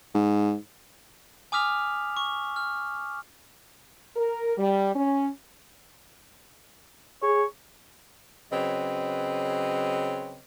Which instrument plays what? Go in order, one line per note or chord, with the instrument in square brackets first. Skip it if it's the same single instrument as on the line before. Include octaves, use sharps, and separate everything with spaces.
[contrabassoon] G#2
[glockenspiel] G#5 D6 D#6 F6 B6 F7
C#6
F6
[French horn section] A#4
G3
C#4
[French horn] G#4 [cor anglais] C#5
[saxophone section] C#3 F#3 C4 B4 C#5 D#5